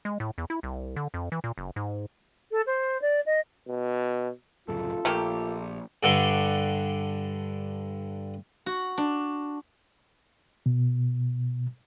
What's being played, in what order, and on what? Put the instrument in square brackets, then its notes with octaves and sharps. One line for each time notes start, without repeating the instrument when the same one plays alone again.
[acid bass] G#3
A2
E2
E4
C2
D3
F2
E3
A#2
F#1
G#2
[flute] A4
C5
D5
D#5
[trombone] B2
[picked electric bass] D1 F#2 C#3 [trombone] F4 [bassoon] A4
[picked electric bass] A#1 [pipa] A3 A#3 G4
[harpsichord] G2 D3 A4 F#5 C#6 D6
[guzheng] F#4
D4
[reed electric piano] B2